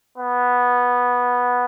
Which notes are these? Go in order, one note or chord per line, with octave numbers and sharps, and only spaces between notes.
B3